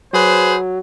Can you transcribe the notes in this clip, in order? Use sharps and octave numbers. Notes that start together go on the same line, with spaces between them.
F#3 G#4 B4 C5